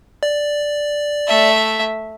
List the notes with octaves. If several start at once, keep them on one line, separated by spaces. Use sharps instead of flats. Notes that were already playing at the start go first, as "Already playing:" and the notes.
D5
A3 E5